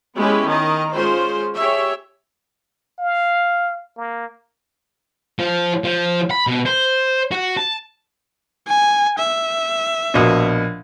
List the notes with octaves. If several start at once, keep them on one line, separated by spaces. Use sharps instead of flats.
G#3 B3 C#4 E4 G4 B4
D#3 D#5 A#5
G#3 C#4 F4 C5
G4 G#4 C#5 E5
F5
A#3
F3
F3
B5
B2
C5
F#4
A5
G#5
E5
A#1 B2